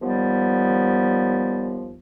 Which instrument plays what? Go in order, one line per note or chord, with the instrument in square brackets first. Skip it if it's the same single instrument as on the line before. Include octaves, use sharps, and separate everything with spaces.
[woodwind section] D#2 F3 G3 B3